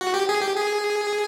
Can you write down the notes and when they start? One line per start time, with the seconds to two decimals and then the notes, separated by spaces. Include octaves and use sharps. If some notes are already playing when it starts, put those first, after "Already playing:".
0.01 F#4
0.14 G4
0.29 G#4
0.42 G4
0.56 G#4